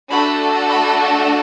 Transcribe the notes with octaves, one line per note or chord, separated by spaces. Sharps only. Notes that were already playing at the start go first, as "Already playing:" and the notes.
A3 D4 F#4 A4 B5
B5